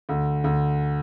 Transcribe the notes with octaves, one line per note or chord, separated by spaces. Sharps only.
D2
D2